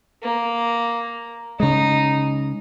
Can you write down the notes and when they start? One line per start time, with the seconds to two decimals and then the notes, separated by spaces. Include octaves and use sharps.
0.23 A#3
1.60 C#3 G#3 D#4